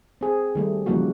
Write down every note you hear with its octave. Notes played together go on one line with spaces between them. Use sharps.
C4 G#4
D#3 G3 A3
C#3 E3 F3 G3 A#3 F#4